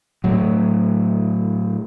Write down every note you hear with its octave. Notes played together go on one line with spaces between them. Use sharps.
A2 F#3